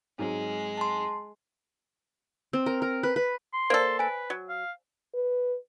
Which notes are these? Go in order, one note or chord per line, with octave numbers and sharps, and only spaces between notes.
G#2 F#3 G#3 C4
A5 C6
C4
A#4
A#4
B4
B4
C6
A#3 A4 C5 D5
B4 G#5 D7
F#3
F5
B4